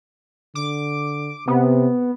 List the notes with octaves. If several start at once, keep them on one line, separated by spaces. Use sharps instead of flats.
D3 D6
C3 B3